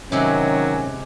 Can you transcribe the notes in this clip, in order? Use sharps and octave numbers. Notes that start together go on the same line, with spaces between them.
C3 D#3 F#3 G#3 C#4 G4